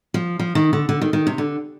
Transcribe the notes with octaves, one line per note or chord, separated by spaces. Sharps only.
F3
F3
D#3
D3
D3
D#3
D#3
C3
D3